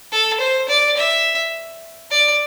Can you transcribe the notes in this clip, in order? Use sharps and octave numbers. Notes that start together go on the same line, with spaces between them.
A4
C5
D5
E5
D5